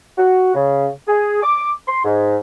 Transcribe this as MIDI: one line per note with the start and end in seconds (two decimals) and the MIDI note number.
0.18 0.53 66
0.55 0.88 49
1.08 1.41 68
1.43 1.72 86
1.88 2.00 84
2.05 2.37 44